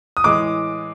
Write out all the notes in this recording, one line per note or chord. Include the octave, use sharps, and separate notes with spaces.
D#6
A2 E3 G#3 D6